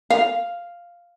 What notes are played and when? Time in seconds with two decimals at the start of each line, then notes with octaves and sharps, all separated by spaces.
0.10 F5